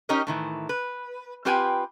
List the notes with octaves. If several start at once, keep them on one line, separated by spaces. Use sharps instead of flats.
C#4 D#4 G4 A#4 C#5 D#5
A2 D#3 E3
B4
C4 F4 G4 B4 G5 G#5